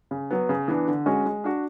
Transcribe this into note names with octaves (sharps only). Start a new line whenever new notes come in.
C#3
F#3 B3
C#3
E3 B3 D4
D3
G#3 C#4 F#4
G#3
D4 F#4